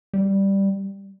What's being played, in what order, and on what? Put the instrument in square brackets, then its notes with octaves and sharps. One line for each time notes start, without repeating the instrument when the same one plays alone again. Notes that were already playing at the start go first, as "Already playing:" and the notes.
[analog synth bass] G3